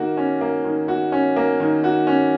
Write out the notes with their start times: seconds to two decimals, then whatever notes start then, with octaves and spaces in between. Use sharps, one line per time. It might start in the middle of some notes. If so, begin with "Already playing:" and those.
Already playing: D#3 A#3 F#4
0.17 C#4
0.41 A#3
0.64 D#3
0.88 F#4
1.12 C#4
1.36 A#3
1.60 D#3
1.84 F#4
2.07 C#4